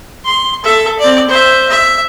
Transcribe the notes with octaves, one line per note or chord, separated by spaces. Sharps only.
C6
A4 E5
C4 D5
C5 E5
E5